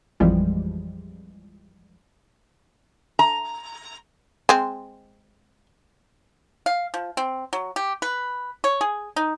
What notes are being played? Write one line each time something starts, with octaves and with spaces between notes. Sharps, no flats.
A1 F2 E3 F3 G3 G#3
A#5
G#3 C4
F5
F3
C4
F#3
G4
B4
C#5
G#4
D#4